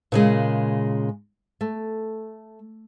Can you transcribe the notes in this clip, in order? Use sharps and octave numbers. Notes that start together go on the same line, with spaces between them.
A#2 C#3 G#3
A3